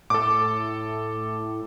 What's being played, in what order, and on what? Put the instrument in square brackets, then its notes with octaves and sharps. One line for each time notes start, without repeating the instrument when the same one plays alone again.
[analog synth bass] A2 [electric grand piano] A4 D6